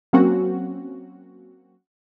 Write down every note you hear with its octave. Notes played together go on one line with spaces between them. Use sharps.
F#3 A#3 C4 C#4 F#4